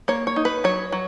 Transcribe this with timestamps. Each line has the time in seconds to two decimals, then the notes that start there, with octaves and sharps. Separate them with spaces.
0.08 A#3 C#5
0.27 C#5
0.36 D#4
0.45 B4
0.64 F#3 C#5
0.92 F#3